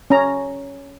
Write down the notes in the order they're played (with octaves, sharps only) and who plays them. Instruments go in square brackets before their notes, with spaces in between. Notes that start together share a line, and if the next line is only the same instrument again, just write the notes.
[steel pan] C#4 A#5